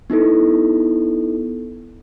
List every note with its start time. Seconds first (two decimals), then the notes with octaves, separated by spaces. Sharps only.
0.10 B3 D#4 E4 A4